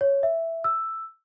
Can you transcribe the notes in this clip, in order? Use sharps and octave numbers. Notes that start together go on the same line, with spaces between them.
C#5
E5
E6